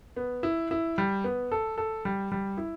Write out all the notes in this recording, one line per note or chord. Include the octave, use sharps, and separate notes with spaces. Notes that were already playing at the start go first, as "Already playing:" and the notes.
B3
E4
E4
G3
B3
A4
A4
G3
G3
E4